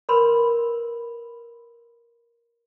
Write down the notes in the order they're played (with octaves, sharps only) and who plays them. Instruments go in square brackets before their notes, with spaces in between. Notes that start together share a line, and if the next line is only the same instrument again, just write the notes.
[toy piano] A#4 B4 B5 C6